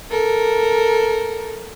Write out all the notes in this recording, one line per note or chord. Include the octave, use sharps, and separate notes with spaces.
A4 A#4